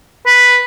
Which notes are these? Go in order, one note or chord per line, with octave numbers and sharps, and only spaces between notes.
B4